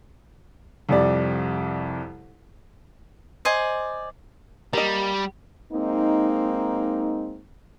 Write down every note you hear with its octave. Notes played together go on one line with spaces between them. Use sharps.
C2 F2 G3 D5
C5 D5 D#5 G#5
G3 A#3 D#5
G#3 A#3 C4 D#4